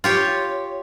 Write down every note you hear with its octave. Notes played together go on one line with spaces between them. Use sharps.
F4 G4 C#5